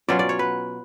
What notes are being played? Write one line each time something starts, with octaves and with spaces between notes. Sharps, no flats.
B2 F#3 C#4 F4 D5
D5
C#5
B4